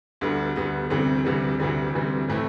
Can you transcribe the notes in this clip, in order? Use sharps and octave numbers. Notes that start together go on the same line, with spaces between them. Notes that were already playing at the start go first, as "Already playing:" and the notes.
D2 D3 G3 B3
D2 D3 G3 B3
D2 C3 E3 G3 C4
D2 C3 E3 G3 C4
D2 C3 E3 G3 C4
D2 C3 E3 G3 C4
A2 E3 A3 C4 E4